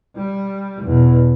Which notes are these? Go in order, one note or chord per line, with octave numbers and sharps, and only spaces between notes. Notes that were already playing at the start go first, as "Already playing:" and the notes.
G3
E2 B2